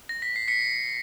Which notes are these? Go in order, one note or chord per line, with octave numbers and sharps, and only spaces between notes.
A#6
B6
C7
B6 C#7